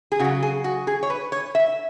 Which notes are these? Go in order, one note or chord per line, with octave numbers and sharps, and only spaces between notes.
G#4
C#3 F#3 F#4
G#4
F#4
G#4
C#5
B4
C#5
E5